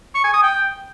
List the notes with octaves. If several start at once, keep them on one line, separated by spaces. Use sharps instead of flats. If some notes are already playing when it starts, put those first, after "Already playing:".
C#6
G#5
D#6
G5